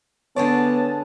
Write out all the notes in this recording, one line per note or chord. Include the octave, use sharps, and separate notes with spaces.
D3 G#3 B3 C#5 D5 A5